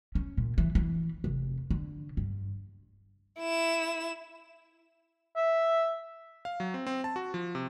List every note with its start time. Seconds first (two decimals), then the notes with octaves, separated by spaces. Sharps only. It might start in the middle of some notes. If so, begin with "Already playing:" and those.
0.15 C#4
0.37 A#2
0.58 E3
0.75 E3
1.24 F1
1.71 D3
2.17 G2
3.40 E4 E7
5.36 E5
6.45 F5
6.60 F#3
6.74 C4
6.87 C4
7.04 A5
7.16 F#4
7.34 F3
7.55 C3